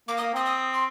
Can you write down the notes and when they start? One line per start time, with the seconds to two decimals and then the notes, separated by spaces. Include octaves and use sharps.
0.08 A#3 D6
0.18 D#6
0.21 A#3
0.34 C4 D#6
0.46 D#6
0.73 C6